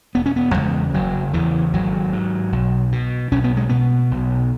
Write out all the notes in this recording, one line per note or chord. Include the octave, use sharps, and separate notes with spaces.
E1 B3
C#4
B3
E2 C#3 G#3
F#1 F#3
E2 C#3 E3
G#1 F#3
G#2
B1
B2
B1 C#4
B3
G#3
B2 B3
B1